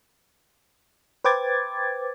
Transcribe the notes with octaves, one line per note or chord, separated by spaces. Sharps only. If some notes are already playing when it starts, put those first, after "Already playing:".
B4 C5 G5 D6 G#6 A6